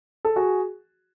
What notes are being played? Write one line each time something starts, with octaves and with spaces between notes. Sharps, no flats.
A4
F#4 G#4